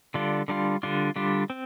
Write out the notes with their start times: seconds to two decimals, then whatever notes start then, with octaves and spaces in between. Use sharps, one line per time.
0.14 D3 G3 D4 F4
0.48 D3 G3 D4 F4
0.83 D3 G3 D4 F4
1.16 D3 G3 D4 F4
1.50 C4